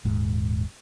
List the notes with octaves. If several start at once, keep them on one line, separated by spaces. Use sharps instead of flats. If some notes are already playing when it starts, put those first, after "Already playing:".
D#1 G#2